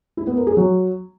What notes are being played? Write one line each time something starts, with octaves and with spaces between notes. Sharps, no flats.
E4
B3
A#4
G#4
F#3